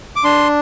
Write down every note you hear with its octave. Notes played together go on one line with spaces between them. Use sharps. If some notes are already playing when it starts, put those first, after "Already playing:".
D6
D4 C6